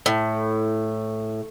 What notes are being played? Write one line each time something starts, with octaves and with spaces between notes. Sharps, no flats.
A2